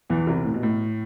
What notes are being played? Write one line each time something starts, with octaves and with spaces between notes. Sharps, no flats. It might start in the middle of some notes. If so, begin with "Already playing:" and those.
E2 E3
C2 C3
A2
B2
A2